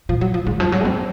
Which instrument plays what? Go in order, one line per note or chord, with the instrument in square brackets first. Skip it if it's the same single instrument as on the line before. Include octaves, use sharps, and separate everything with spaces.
[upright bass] A#2 [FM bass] F3
[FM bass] F#3
F3
[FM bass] G#2 [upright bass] D#3
[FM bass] F#2 [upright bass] F3
[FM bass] G#2 [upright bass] F#3
[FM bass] F#2 [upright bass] C4